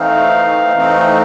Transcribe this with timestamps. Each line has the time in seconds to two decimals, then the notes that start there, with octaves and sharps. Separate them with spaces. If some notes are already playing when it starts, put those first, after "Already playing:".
Already playing: E3 A3 C4 D#4 F5
0.74 E3 A3 C4 D#4